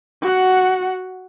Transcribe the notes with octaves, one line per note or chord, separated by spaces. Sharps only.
F#4 F#5